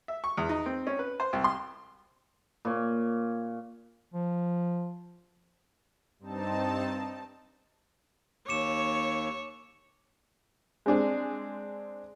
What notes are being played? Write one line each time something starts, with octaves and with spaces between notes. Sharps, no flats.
E5
C#6
E2
D#4
C4
C#4
B4
C5
C2
C6
A#2 C#5
F3
G2 C4 D#4 A5
D#2 C#5 D6 C#7 E7
G#3 C4 D4 G#4